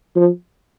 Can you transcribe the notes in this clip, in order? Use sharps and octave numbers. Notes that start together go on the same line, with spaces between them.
F3